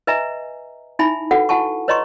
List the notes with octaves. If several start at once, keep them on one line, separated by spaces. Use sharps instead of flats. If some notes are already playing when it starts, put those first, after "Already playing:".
B4 D#5 E5 G#5 A#5
D#4 E4 E5 G#5 B5
F#4 A4 B4 F#5 G5
E4 F#4 F#5 G#5 A5 C#6
B4 C#5 D#5 A#5 C6 C#6